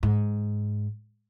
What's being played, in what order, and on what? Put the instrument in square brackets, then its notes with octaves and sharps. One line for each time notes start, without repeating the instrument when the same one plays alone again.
[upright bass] G#2